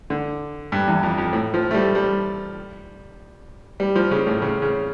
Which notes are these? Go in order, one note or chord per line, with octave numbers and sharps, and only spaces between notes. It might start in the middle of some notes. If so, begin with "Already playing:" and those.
D3
G2
E2
F2
F2
A2
F3
A3
G3
G3
G3
F3
C#3
A2
C#3
C#3